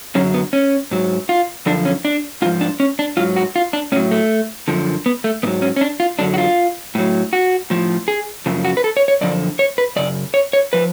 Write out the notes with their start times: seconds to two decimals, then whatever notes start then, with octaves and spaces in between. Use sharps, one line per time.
0.15 F#2 D3 F#3 C#4
0.34 B3
0.53 C#4
0.91 G#2 F#3
1.29 F4
1.66 F#2 D3 F3 D4
1.85 C#4
2.05 D4
2.42 G#2 F4
2.45 F3
2.61 D4
2.80 C#4
2.99 D4
3.17 G#2 F#3 F4
3.36 F#4
3.56 F4
3.73 D4
3.92 A2 C#4
3.96 F#3
4.11 A3
4.68 F#2 D3 F3
5.06 B3
5.24 A3
5.43 G#2 F#3 B3
5.62 C#4
5.76 C#4
5.81 D4
6.00 F4
6.19 F#2 D3 F#3 D4
6.34 F#4
6.38 F4
6.95 A2 F#3
7.33 F#4
7.70 A2 F3
8.08 G#4
8.46 F#2 C#3 F3
8.65 F#4
8.77 B4
8.84 A4
8.97 C#5
9.08 C#5
9.21 F#2 D3 F3 D5
9.59 C#5
9.78 B4
9.96 F#2 C#3 D5
10.34 C#5
10.53 C#5
10.73 F3 B4